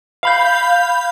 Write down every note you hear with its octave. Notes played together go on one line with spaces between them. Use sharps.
F5 B5 G6